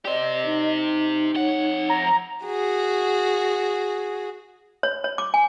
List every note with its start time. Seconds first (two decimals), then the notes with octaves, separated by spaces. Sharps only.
0.05 G4 C5 D5 D#5
0.46 D#4
1.35 F2 C#5 F#5
1.90 A#5
2.45 F#4 G#4
4.83 C#5
5.04 C#5
5.18 D6
5.34 G#5